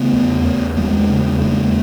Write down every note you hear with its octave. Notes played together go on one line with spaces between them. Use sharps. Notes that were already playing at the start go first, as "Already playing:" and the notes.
Already playing: C#3 A3 B3
E2
E2
E2 G#3 A#3
C#3
E2 G#3 A#3